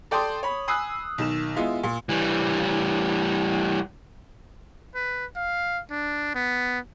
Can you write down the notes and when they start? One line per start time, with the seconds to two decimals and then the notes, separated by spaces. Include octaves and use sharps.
0.11 A4 D5 G5 A5 C6 D#6
0.43 C#5 B5
0.68 G#5 B5 D#6 E6 F#6 C7
1.18 B1 D#3 E7
1.56 G#3 B3 E4 F4
1.84 A#2
2.09 E3 G3
4.95 B4
5.36 F5
5.90 D4
6.34 B3